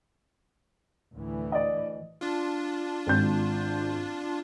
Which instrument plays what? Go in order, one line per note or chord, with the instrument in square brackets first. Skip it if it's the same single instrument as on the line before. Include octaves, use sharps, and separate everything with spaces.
[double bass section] D2 A2 E3
[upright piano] D5 D#5
[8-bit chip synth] D4 F4
[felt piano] G#1 G6